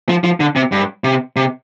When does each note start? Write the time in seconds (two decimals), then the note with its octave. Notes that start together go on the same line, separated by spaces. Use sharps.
0.09 F3
0.24 F3
0.40 D3
0.56 C3
0.72 G2
1.04 C3
1.36 C3